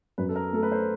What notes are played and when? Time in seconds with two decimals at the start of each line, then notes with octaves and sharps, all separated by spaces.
0.18 F#2 B4
0.29 A4
0.36 A#4
0.53 A3 A4
0.63 B4
0.72 C5